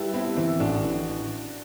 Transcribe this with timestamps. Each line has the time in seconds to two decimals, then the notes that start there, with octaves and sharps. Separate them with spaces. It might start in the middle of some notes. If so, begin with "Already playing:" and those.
Already playing: G3 E4 G4 A4 B4
0.13 B3 C4 E4
0.36 E3 C4 E4
0.60 A1 D4 F#4
0.83 E3